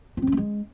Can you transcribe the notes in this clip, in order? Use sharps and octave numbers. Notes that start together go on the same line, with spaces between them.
F4
C4
C#4
A3
G#3